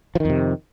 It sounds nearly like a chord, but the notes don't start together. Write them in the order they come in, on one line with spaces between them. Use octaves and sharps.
F3 D#3 F2 C3